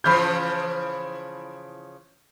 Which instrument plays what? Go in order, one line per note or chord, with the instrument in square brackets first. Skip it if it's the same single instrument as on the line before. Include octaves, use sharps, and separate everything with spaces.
[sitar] C#3 E3 F3 [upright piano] B5 F6 G6